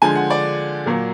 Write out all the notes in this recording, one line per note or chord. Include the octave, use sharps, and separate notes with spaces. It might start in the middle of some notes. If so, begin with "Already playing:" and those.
D3 F3 G#3 G#5
F#5
D5
A#2 F#3 A#3